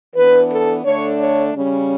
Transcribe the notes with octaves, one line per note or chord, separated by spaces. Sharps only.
E3 B3 D4 B4
A4
D3 A3 D4 C#5
C#5
C#3 G3 C#4